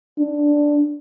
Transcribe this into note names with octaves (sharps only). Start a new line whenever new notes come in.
D4